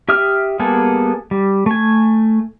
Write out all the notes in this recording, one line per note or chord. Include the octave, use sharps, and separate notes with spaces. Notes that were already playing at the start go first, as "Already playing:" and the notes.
G4 E5 D#6 F6
G3 A#3 B3 G#4 A4
G3
A3 G#5